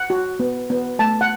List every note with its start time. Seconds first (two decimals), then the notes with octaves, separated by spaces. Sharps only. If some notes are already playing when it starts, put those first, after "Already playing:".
Already playing: F#5
0.10 F#4
0.40 B3
0.70 B3
0.99 A3 A5
1.21 F#5